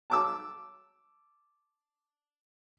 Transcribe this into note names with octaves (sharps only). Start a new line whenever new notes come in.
A5 D6 E6